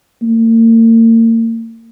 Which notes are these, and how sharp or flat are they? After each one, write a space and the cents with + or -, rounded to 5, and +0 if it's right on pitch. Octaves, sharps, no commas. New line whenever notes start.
A#3 -40